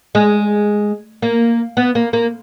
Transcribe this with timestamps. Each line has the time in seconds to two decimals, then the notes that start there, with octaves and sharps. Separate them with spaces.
0.15 G#3
1.22 A#3
1.77 B3
1.95 A#3
2.13 A#3